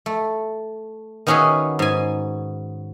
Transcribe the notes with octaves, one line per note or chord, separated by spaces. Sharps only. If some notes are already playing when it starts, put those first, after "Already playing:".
A3
D#3 B3 C#4 F#4 G#4 E5
G#2 G#5